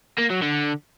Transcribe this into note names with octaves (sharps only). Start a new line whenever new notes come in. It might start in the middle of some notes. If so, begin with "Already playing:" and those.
A#3
F#3
D3